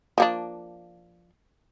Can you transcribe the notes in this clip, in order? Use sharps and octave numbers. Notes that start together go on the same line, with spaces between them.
F3 A#3 D4